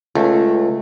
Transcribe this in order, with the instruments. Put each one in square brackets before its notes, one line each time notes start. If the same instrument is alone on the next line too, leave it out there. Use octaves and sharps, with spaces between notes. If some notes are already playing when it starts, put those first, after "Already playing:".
[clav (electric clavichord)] C#2 [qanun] A3